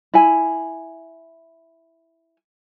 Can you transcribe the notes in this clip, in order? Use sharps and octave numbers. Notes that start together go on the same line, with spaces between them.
E4 G#5